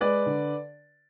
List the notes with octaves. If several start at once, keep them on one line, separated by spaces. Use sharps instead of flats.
G#3 B4 D5
D3